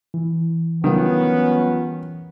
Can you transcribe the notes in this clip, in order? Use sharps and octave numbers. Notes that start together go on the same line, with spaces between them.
E3
D#3 F#3 G3 B3 C#4 F4